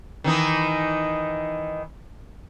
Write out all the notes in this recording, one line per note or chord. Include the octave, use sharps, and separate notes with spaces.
D#3 E3 D#4